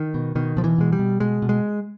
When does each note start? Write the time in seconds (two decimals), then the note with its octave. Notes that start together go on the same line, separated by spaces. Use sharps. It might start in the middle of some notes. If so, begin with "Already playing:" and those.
Already playing: D#3
0.14 B2
0.35 B2 D#3
0.57 B2 F3
0.64 E3
0.78 B2 G#3
0.92 G3
0.99 B2
1.20 B2 G#3
1.42 B2
1.49 G#3